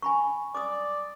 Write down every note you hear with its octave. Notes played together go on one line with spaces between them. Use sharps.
G#5 B5 C#6
D5 D6 D#6